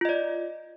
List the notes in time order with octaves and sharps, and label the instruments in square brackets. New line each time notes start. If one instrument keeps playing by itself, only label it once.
[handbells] F4
D#5
D5